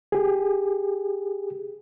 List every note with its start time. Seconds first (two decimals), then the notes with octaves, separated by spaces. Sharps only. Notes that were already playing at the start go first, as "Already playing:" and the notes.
0.12 G4 G#4